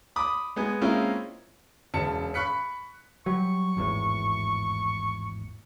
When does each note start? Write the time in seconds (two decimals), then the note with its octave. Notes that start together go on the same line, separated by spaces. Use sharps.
0.16 B5 D6 D#6
0.56 G#3 B3 G#5
0.81 G#3 A#3 C4 C#4 E4 F4
1.94 E1 C#3 C#4 A5 C#7
2.34 B5 C#6 F#6 B6 C#7
3.26 F#3 G3 C#6
3.77 G#1 E2 A2